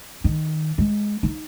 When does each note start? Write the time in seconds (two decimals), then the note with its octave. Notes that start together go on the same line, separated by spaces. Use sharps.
0.24 D#3
0.78 G#3
1.23 D#4